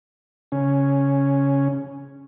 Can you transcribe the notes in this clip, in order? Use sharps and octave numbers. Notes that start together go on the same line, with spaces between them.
C#3 C#4